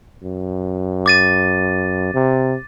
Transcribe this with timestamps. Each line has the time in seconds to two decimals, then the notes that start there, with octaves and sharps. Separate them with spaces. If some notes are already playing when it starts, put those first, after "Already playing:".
0.23 F#2
1.06 D6 A6 D#7
2.14 C3